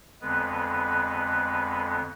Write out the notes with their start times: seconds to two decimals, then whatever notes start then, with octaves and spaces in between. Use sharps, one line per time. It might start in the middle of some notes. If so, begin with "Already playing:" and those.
0.21 F2 D3 G#3 B3 B4